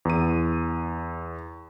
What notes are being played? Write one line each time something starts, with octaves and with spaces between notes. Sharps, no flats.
E2 D#7